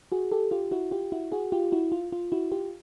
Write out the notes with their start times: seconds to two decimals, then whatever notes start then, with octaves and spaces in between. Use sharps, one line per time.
0.12 F#4 G#4
0.32 G4 A4
0.51 F4 G4
0.71 E4 F#4
0.91 F4 G4
1.12 E4 F#4
1.32 F#4 G#4
1.52 F4 G4
1.72 E4 F#4
1.92 F4
2.12 F4
2.32 E4 F#4
2.52 F4 G4